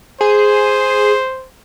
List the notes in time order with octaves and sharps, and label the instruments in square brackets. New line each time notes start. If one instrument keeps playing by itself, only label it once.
[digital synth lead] G#4 [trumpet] C5